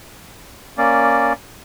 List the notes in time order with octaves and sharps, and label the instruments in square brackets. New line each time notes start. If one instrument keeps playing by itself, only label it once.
[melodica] A#3 C#4 D5